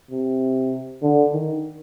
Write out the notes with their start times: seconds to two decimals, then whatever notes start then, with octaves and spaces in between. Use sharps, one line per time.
0.11 C3
1.02 D3
1.33 D#3